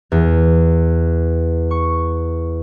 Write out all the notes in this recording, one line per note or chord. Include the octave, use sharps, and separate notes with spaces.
E2
C#6